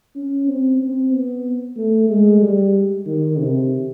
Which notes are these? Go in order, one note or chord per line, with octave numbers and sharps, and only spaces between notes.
C#4
C4
C4
B3
A3
G#3
G3
D#3
C3